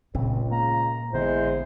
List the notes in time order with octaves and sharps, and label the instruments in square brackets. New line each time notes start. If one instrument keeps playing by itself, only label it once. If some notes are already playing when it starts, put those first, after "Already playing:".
[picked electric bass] G1 C#3 C4 [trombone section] C#2 [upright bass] A#2
[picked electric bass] A#3 [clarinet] A#5
[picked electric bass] A1 D3 B3 [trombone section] G#3 E4 [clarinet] C5